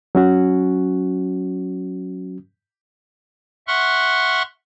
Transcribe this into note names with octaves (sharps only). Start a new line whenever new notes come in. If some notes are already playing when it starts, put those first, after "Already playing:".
F#3 C#4 F#4
E5 F#5 C6 C#6 F6 F#6